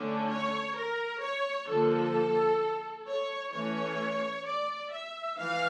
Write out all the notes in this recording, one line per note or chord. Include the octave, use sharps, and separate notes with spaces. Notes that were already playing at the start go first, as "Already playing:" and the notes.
Already playing: D3 A3 C#4 D4
C#5
A#4
C#5
D3 F3 A#3 A4
C#5
E3 A3 C#4 C#5
D5
E5
E3 F5